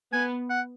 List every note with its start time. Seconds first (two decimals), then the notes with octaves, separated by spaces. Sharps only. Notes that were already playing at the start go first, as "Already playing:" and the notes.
0.13 B3 G#5
0.50 F#5